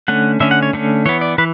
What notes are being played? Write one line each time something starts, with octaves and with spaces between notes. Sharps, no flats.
D3 A3 C#4 F#5
D3 A3 C#4 E5
F#5
C#5
D3 A3 C#4
E3 B3 C#5
D5
E3 B4